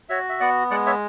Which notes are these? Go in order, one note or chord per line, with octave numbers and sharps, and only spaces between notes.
F#4 C#5 E5
E5
B3 D5 F#5
G#3 D5 F#5
C#5 E5